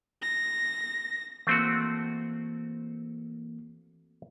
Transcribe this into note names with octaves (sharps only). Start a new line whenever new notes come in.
A#6
E3 A3 A#3 C4 F#4